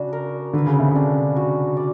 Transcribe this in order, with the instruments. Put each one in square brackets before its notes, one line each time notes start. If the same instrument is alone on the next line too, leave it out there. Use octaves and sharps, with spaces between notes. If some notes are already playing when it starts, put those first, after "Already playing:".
Already playing: [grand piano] C#3 [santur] D4 F#4
[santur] A#4
[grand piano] D3 [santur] B4
[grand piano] C#3
C3
[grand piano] C#3 [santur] D4
[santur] F#4
D5